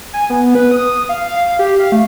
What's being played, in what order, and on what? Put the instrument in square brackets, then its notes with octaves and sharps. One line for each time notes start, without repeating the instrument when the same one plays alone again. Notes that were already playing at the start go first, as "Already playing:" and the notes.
[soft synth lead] G#5
B3
B4
D#6
F5
F5
G4
F5
A3